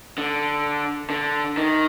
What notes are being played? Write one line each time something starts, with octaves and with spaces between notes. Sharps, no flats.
D3
D3
D#3